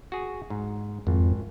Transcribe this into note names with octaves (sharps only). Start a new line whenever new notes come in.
F#4 G#4
G#2
G#1 F2